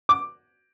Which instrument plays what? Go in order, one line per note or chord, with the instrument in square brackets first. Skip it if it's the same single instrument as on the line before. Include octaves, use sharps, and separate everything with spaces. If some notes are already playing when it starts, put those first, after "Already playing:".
[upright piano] D6